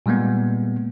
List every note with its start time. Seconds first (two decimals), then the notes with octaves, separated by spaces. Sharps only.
0.06 A#2 G3 G#3 A#3 B3